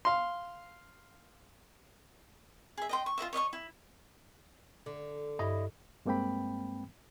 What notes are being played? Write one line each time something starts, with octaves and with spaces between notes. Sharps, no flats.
F5 C6
G#4 E5
D#5 G5 C6
C#6
F4 B4 D#5 E5
C#5 D#5 E5 C#6
E4
D3
G2 E4 D#5
G2 G#3 A#3 C4 G5 B5